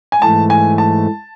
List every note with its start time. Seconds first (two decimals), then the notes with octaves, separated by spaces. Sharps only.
0.12 G#5
0.22 G#2 E3 A3 A5
0.50 G#5
0.78 A5